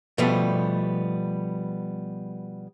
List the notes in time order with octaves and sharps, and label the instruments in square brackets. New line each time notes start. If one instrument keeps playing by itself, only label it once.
[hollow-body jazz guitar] B2 F3 G3 A3 B3